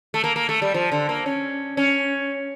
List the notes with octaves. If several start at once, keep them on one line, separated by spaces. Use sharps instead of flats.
A3
A#3
A#3
A3
G3
F3
D3
A#3
C#4
C#4